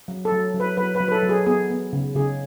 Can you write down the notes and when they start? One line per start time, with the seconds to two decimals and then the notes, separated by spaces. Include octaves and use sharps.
0.08 F#3
0.25 A4
0.32 F#3
0.54 F#3
0.60 B4
0.77 F#3 B4
0.95 B4
1.00 F#3
1.08 B4
1.12 A4
1.23 F#3
1.29 G#4
1.46 B3 G#4
1.70 B3
1.93 C#3
2.15 C#3 G#4